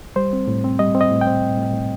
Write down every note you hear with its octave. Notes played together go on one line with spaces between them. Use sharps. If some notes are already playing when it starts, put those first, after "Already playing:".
G3 C5
C4
A2
C4
G3 D#5
C4
D#5
A2
G5
C4
A2
A2
A2